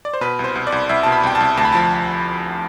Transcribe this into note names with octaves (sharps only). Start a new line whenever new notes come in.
D5
C5
B2 B4
C2
C5
C2
D5
C2
C2 E5
B2 A5
B5
C2 G5
A5
C2
D2 A5
B5
F3 A5